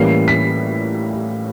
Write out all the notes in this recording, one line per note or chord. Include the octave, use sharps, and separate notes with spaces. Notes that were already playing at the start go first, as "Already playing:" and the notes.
Already playing: A2 E3 G3 A#3 C#4 C7
B6